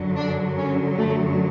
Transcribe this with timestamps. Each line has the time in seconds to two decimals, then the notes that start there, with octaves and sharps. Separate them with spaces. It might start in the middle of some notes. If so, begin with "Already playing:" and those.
Already playing: F#2 D3 F#3
0.16 D4
0.57 C#4
0.98 A3